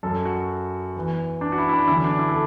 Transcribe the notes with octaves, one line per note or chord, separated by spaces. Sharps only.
F#2 F#3 A4
F#4
E2 E3
D4
F#4
E4
E4
D4
E2 D3 F#3 E4
D4
E4
A4